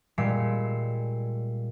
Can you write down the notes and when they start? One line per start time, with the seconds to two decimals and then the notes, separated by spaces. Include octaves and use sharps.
0.18 A#2 G3 G#3 E6 C7 C#7